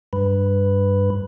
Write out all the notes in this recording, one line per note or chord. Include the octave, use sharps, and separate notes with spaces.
G2 B4